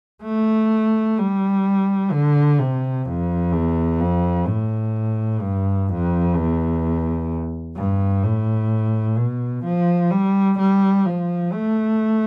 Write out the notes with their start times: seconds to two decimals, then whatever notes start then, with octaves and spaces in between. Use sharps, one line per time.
0.23 A3
1.18 G3
2.12 D3
2.59 C3
3.06 F2
3.53 E2
4.01 F2
4.47 A2
5.41 G2
5.89 F2
6.35 E2
7.76 G2
8.23 A2
9.18 B2
9.65 F3
10.11 G3
10.59 G3
11.06 F3
11.53 A3